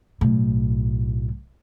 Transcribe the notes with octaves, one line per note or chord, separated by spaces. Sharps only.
B1 A2